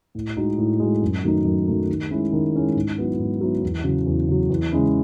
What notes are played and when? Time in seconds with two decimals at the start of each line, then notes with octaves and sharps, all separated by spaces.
0.15 A2
0.36 G#3 D#4 F#4
0.58 A2
0.80 G#3 D#4 F#4
1.02 F#2
1.24 D#3 F#3 A3 D#4
1.45 F#2
1.67 D#3 F#3 A3 D#4
1.89 D#3
2.11 G#3 C#4 E4
2.33 D#3
2.53 G#3 C#4 E4
2.76 G#2
2.98 F#3 B3 E4
3.19 G#2
3.41 F#3 B3 E4
3.63 E2
3.84 C#3 F#3
4.06 E2
4.29 C#3 F#3
4.50 E2
4.72 C#3 G#3 C#4 E4